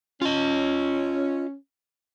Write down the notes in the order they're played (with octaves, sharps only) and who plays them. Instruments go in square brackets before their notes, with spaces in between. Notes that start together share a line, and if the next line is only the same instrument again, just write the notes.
[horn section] C#4 [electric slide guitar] F4 D#5